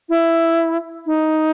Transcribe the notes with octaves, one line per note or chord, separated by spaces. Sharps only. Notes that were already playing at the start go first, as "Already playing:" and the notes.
E4
D#4